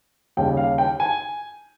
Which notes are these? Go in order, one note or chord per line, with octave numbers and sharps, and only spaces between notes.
D#2 C#3 G3 G5
F5
G5
G#5